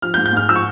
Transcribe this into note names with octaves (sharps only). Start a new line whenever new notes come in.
F3 F6
G6
G#2
G6
G#2 F6
F3 E6
C#6